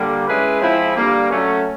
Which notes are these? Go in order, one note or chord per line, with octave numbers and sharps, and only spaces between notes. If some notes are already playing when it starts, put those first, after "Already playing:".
Already playing: D3 G3 A#3
G#3 C#4 E4 G#4 B4
F3 G#3 C4 E4
G2 D3 G3 A#3
F#3 A3 C#4